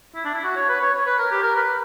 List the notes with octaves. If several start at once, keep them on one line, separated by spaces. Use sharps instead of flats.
E4
D4
E4
F#4
C#5
B4
C#5
C#5
B4
A#4
G4
A#4
B4